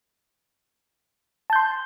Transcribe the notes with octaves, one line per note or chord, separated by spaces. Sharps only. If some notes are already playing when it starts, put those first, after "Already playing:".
A5 C6 G6